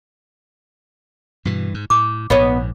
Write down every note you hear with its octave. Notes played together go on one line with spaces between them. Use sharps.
G2 B2 E3
G#2
A2 D6
A#1 G#2 B3 C#5 D#5